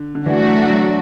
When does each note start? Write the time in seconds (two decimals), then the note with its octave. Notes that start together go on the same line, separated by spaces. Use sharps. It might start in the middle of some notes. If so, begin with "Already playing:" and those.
Already playing: D3
0.15 D3
0.26 E3 A3 D4 F#4
0.41 E3
0.48 F#3
0.70 F#3